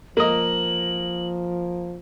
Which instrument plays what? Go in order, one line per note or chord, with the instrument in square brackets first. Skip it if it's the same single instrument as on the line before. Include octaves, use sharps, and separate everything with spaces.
[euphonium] F3 [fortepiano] A#3 D#5 [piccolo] F#7